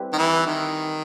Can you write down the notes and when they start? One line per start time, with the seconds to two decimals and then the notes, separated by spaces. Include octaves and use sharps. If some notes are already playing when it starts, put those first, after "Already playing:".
Already playing: G3 C4 E4 G4 B4
0.13 D#3
0.18 E3
0.46 D#3